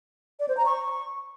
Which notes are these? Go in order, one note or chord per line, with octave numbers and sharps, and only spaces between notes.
D5
C5
A#5
C#6